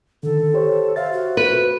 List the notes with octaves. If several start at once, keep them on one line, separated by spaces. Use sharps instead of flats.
D3 D#3 A4
G4 C5 C#5
C5 E5 F5 A6
F#4
B4